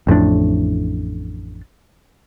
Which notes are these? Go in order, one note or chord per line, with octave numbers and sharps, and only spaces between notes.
A1 F2 A2 D4